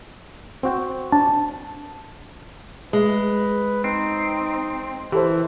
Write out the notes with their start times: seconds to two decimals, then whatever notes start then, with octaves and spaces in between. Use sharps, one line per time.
0.63 C4 F#4 G5
1.12 D4 A5
2.93 G#3 B4
3.84 C4 D#4
5.12 E3 E4 G4 A4 C5